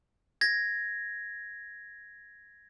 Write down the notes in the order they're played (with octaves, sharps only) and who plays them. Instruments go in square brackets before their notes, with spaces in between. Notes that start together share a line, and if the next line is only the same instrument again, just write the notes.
[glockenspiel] G#6 A#6